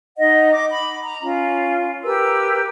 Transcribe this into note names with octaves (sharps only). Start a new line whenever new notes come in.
D#4 D#5 F#5
D6
B5
A#5
C#4 F4
G4 A#4 B4 E6